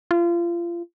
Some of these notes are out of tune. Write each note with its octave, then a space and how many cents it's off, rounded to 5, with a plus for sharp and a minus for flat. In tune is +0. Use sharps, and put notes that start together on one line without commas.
F4 -30